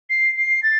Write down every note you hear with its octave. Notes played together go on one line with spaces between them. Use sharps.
C7
C7
A6